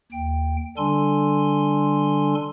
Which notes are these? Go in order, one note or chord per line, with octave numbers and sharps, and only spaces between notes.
D#2 G5
D3 G3 D4 A4 G#5 C6